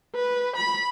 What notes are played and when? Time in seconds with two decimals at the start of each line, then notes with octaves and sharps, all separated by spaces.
0.15 B4
0.57 B5